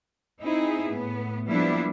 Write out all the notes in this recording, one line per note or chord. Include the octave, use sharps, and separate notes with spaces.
C4 D#4 E4 G#4
A2 B3
F3 G3 A#3 B3 D4 E4